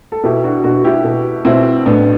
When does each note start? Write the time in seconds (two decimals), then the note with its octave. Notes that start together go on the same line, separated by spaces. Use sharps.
0.12 A4
0.24 B2 E4 G4
0.44 D4 F#4
0.64 B2 D4 F#4
0.84 E4 G4
1.04 B2
1.45 B2 C4 E4
1.86 A2 B3 D4